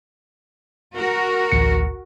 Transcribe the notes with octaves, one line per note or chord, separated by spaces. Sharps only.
F#4 A#4
A1 D2 C#7